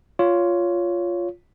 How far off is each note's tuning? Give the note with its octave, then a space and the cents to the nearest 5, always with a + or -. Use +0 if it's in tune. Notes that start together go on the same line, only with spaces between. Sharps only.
F4 +0 C#5 +15